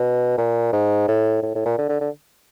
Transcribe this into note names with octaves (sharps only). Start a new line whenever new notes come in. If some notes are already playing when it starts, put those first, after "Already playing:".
Already playing: B2
A#2
G#2
A2
A2
A2
A#2
D3
D3
D3